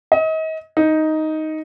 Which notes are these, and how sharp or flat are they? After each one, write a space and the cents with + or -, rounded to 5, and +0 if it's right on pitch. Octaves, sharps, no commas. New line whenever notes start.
D#5 +35
D#4 +5